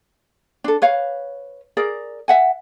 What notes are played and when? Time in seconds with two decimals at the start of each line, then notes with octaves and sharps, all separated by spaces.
0.64 D4 A4
0.82 B4 C#5 F5
1.77 G#4 A#4 D5
2.28 E5 F#5 G#5